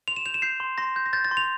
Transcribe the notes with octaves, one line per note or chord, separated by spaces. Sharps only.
C6 F7
E7
G6 F7
E7
G6 C7
C6
C6 A#6
G6
A#6
G6 A6
A6
C6
F7